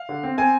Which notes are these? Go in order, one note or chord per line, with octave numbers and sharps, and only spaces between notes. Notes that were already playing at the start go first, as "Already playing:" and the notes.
Already playing: F5
D3
C4
C4 G#5